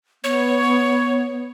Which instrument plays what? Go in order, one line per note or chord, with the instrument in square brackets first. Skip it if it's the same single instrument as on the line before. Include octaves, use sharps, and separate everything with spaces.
[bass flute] B3 [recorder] C#5